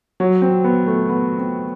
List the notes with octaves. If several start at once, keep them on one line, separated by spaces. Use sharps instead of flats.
F#3
C4
B3
A3
B3
C4